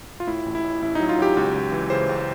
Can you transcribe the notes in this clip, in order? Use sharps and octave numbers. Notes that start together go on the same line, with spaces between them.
F4
A2 E4
A1
E4
A1
A1 E4
D#4
F#3
F4
F#3 G4
C#2
C#2
E3
C#3 C5
C#2